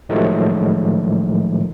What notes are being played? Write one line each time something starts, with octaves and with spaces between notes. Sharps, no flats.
A2 D#3 F3 F#3 G#3 A3